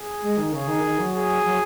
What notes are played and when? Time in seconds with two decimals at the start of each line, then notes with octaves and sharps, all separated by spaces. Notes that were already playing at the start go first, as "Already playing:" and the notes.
Already playing: G#4
0.22 G#3
0.37 D#3
0.52 C#3 G#4
0.67 D#3
0.83 D#3
0.98 F#3
1.12 G#4
1.44 F#3